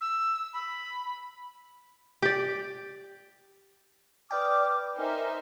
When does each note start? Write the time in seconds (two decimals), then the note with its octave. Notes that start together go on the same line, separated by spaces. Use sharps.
0.01 E6
0.53 B5
2.22 G4 D5
4.31 B4 D5 G5 D6 D#6 F6
4.97 D#4 A#4 C5 E5 G#5 F6